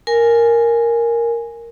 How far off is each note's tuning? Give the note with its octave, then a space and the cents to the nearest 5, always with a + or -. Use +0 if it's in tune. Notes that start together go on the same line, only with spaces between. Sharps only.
A#4 +0 G#5 +0